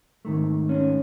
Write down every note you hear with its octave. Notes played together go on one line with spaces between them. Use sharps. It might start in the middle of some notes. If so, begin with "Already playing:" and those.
G#2 D#3 A3
C#4